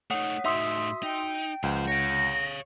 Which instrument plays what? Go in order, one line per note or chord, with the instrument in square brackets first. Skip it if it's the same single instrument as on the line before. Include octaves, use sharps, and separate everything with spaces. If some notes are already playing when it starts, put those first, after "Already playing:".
[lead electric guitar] A3 D#4 [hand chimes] C#5 F#5 D#6
[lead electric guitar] A2 D#4 [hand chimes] F#4 E6 B6 [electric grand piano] E5 C6 D#6
[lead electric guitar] D#4 [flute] G5
[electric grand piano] C#2 [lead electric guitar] F3 C5 [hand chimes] F#5 G6
[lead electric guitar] C#5 F5 [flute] A#6